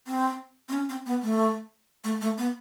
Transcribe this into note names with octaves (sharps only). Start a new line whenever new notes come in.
C4
C4
C#4
C4
B3
A3
A3
A3
B3